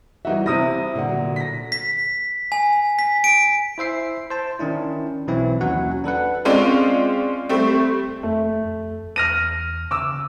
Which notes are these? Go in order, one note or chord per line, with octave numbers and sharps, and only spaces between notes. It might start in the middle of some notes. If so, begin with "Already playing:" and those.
E3 G3 D#4 F#4 E5
C3 E4 D#6 A#6
A#2 D3 F#5
F#3
A#6 B6
B6
G#5
B6
D7
E4 C5 E5 C7
C5 A5
D#3 C#4 D4 E4
B1 E3 C4 E4 C#5
D#2 F#3 C#4 F#4 F#5
D4 A4 B4 F#5
G#3 C4 C#4 F4 D5
G3 A3 C4
F1
F2 A3
F2
E2 F6 A#6 D#7
C#3 D6 E6